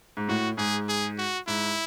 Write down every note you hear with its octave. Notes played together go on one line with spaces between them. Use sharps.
G#2
A2 F#4
G#2 G#4
G#4
F#4
G#2 E4